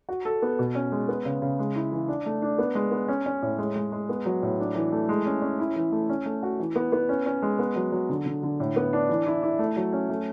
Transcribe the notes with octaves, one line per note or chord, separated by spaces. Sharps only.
F#4
A4
B3
B2
C#4
G#3
B3
C#3
C#3
G#3
E4
E3
D4
A3
D4
B3
G#3
B3
C#4
C#4
A2
G#3
G#3
G#3
B3
F#3
A2
D4
E3
A3
G#3
C#4
C#4
E4
E3
A3
C#4
A3
F#4
E3
B3
B3
C#4
C#4
G#3
B3
F#3
F#3
D3
D3
D3
A2
B3
D4
E3
E4
E4
A3
F#3
C#4
A3